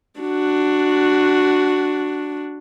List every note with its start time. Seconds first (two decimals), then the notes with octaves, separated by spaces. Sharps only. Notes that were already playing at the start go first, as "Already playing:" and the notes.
0.20 D4 F#4